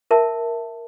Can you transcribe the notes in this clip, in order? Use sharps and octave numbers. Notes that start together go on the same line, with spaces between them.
A#4 E5 A5